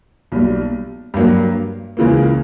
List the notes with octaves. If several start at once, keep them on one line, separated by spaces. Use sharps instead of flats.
B1 A#2 G3
G2 F#3 A#3
C#2 C#3 E3 A#3